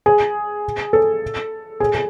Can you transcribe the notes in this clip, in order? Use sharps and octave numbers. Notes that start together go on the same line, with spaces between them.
G#4
A4
G#4
G#4